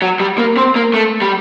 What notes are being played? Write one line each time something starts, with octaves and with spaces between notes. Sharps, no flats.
F#3
G3
A#3
C4
A#3
A3
G3